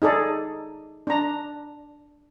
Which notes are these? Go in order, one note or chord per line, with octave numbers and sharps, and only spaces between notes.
D#4 G#4 A4 D5
D4 A#5